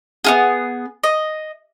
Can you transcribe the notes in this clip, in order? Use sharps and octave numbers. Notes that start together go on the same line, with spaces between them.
B3 F4 G#4
D#5